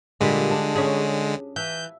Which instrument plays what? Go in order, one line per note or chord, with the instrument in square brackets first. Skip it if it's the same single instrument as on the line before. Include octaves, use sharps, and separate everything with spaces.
[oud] A#2 G3 [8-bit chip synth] D3 G#3
[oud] D4
C#4 G#4
[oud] E3 [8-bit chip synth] G6